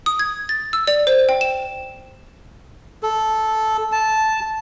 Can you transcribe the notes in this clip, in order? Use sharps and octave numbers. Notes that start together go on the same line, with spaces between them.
D#6
G#6
A6
E6
D5
C5
G5
E7
A4
A5